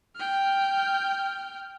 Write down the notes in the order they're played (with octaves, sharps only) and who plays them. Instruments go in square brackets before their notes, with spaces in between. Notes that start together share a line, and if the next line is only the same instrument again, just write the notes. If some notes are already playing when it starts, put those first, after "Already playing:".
[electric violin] G5 F6